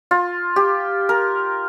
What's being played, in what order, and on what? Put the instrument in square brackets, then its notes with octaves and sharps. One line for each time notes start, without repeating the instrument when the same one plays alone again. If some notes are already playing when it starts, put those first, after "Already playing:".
[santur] F4
G4
A#4